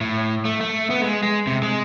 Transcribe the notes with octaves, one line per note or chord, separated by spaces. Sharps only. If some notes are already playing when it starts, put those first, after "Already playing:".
A2
A3
A3
B3
G#3
G#3
C3
G#3